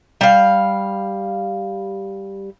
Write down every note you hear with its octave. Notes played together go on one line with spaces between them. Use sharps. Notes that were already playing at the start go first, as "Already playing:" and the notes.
G3 F5